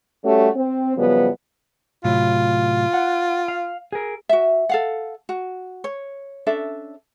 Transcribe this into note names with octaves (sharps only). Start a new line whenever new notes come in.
G3 A3 C#4 F#4 G4
C4
F#2 C#3 F3 G3 B3
A2 C3 F#3 F4
F#5
F5
G#4 A#4
F#4 E5
A4 F5 F#5
F#4
C#5
C#4 D4 A4 E5